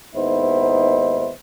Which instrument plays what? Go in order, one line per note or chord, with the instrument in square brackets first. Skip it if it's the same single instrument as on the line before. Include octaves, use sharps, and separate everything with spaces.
[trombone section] D#2 G#2 B3 D#4 E4 C5